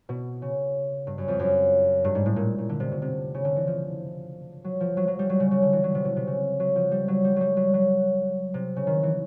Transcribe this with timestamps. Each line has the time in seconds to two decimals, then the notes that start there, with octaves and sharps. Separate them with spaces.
0.09 B2
0.42 C#3
1.07 G2
1.18 F#2
1.28 F2
1.39 F#2
2.04 G2
2.15 G#2
2.26 A2
2.36 A#2
2.58 A#2
2.69 D3
2.80 C3
2.92 B2
3.02 C3
3.34 C#3
3.45 D3
3.56 E3
3.67 F3
4.64 F#3
4.80 F3
4.97 F#3
5.08 F#3
5.19 G3
5.29 F#3
5.40 C#3
5.51 C#3
5.62 D3
5.73 E3
5.84 F#3
5.95 C3
6.05 B2
6.16 C3
6.27 C#3
6.60 F#3
6.76 F3
6.91 G3
7.08 F#3
7.24 G3
7.36 F#3 G3
7.57 F#3
7.74 F#3
8.54 C3
8.76 C#3
8.87 D#3
9.03 E3